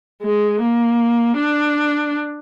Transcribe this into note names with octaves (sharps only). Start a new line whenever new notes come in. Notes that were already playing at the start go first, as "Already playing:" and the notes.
G#3
A#3
D4